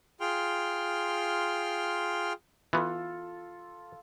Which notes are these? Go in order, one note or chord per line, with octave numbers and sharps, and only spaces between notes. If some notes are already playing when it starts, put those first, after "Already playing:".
F4 G#4 G5 C6 F6
E3 B3 F4 A4